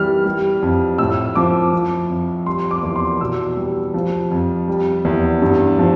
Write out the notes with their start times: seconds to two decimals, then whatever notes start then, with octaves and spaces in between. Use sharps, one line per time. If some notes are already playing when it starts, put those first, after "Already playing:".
Already playing: E3 G3 F6
0.26 G3
0.62 F2
0.98 A2 E6
1.35 F3 D6
1.73 F3
2.10 F2
2.46 G3 C6
2.71 D6
2.83 E2
2.96 C6
3.21 B2 E6
3.57 G3
3.94 F3
4.31 F2
4.68 G3
5.05 E2
5.42 G2
5.79 F3